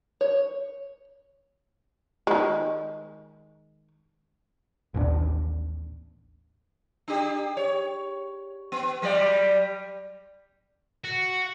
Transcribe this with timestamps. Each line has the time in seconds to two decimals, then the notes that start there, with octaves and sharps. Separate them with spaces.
0.21 C#5
2.27 D#3 G#3
4.94 A1 D#2 C#4 D4
7.08 D4 G4 G#4
7.57 C#5
8.72 B3
9.02 F#3 G3 D5
11.04 F#4